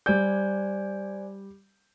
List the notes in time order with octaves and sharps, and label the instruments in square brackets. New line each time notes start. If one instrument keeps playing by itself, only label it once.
[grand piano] G3 G6 [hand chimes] C5 D5 G#5